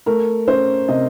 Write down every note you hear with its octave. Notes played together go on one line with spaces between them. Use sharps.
A3 A#4
C#4 C5
C3 D#5